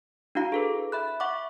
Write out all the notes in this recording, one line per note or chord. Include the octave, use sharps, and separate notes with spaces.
D4 E4 F#4 F5 A#5
G#4 A4 B4
E5 B5 F#6
E5 F#5 C#6 D6